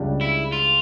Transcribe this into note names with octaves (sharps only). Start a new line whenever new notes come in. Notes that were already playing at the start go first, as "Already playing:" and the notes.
Already playing: C#2 C#3 G3 D4
E4
F4